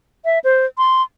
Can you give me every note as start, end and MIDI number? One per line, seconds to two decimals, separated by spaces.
0.25 0.39 76
0.44 0.66 72
0.78 1.02 84